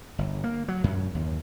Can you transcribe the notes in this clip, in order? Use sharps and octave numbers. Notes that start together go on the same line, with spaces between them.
G1
A#3
F#3
F#2
D#2